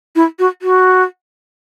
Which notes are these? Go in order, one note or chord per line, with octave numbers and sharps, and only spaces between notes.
E4
F#4
F#4